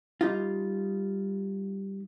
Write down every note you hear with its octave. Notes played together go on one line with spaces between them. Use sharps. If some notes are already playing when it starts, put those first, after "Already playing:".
G3 D#4 F4